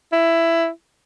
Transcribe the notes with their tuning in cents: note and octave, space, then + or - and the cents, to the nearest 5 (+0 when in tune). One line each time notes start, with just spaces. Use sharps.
E4 +10